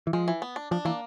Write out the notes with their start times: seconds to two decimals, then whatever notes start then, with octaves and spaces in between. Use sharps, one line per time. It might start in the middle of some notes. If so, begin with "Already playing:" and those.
0.07 E3
0.13 F3 G#3
0.28 E3
0.42 B3
0.56 D4
0.71 F3 D4
0.85 E3 A#3